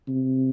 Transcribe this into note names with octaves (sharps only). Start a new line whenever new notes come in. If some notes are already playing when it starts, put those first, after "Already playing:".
C3